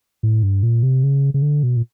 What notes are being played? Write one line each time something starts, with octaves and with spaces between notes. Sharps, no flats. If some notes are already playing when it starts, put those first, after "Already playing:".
A2
G2
A#2
C3
C#3
C#3
D3
B2
A#2